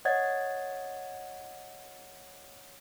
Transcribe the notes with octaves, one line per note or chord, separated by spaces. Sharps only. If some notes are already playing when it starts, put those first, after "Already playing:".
C#5 D#5 F#5 G#6 A6